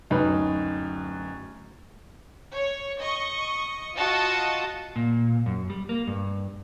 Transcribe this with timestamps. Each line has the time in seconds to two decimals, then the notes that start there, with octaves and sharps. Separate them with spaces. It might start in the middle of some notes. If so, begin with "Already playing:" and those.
0.10 D1 F#2 D#4 B4
2.54 C#5
3.01 D#5 C#6
3.95 F4 F#4 D#5 A5
4.96 A#2
5.46 F#2
5.70 G3
5.89 A#3
6.07 G2